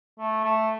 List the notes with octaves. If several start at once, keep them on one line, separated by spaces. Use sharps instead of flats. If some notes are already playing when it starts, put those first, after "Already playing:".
A3
A3